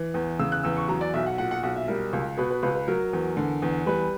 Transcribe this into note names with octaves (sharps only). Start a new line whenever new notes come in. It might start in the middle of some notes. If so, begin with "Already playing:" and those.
Already playing: E3
E2
C#3 E6
F#6
E2 E6
C#6
F#3 A#5
D5
B1 E5
F#5
A#2 F#5
F#5
B1 F#5
E5
G3 A#4
C#2
B2 B4
B4
C#2 B4
B4
F#3 A#4
E2
D3
E2
G3 B4